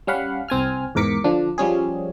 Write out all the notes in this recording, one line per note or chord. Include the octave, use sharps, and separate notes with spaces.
G3 C#4 F5 F#5 B5
C2 C4 G#5 F6
E2 G#2 A#4 D6 B6 C#7
D3 F3 D4
F3 G3 C#4 G#4